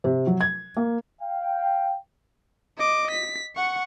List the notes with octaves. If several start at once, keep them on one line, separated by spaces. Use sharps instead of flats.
C3
F#3
G#6
A#3
F5 G5
D#5 D6
B6
F#5 C#6